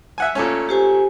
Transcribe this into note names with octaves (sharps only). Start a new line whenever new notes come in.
E5 F#5 G#5
A#2 A3 C#4
G4 C5 G#5